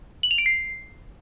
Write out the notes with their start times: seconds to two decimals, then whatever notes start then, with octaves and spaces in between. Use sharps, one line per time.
0.23 F#7
0.31 F7
0.38 D7
0.46 C7